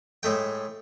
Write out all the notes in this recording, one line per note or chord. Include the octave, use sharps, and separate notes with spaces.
A2 G#3 A3 G5